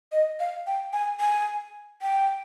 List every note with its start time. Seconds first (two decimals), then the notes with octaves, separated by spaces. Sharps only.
0.12 D#5
0.40 F5
0.67 G5
0.93 G#5
1.20 G#5
2.02 G5